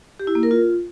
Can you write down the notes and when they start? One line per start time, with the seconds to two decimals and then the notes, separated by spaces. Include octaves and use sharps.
0.19 G4
0.27 E4
0.35 A#3
0.43 A#4
0.51 F4